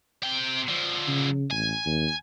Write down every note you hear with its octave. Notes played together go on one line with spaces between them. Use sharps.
C3 G5
D3 F3
C#3
A1 G#5
D#2